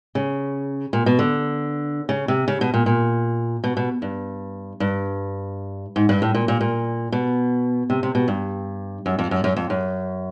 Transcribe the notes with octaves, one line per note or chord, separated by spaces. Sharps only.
C#3
A#2
B2
D3
C#3
C3
C#3
B2
A#2
A#2
B2
B2
G2
G2
G#2
G2
A2
A#2
A#2
A#2
B2
C3
C3
B2
G2
F#2
F2
F#2
F#2
F2
F#2